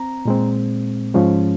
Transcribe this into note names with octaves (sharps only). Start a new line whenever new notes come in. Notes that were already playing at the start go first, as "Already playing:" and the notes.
Already playing: C4 A#5
A#2 G#3 C4
G#2 F3 G#3 C#4